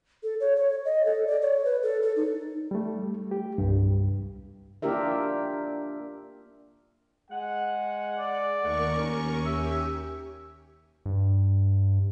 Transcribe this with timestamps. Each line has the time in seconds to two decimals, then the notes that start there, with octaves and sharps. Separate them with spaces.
0.23 A4
0.40 C#5
0.56 C#5
0.85 D#5
1.06 A4
1.27 D5
1.42 C#5
1.65 B4
1.83 A4
2.02 A4
2.16 D#4
2.71 G3 A3
3.31 G4
3.58 C2 G2
4.82 A#3 D4 F4 G4 A#4 E5
7.31 G#3 F#5
8.19 D5
8.63 D#2 A3 A#4 F#5 C#6
8.95 C#4
9.46 G4 E5
11.06 G2